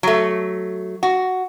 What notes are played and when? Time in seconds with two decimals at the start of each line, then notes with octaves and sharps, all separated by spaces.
0.03 F#3 A3
1.03 F#4